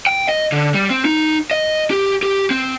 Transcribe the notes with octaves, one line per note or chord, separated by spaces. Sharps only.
G5
D#5
D3
G3
C4
D#4
D#5
G4
G4
C4